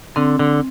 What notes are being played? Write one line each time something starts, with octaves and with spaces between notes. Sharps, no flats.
D3 C4
D3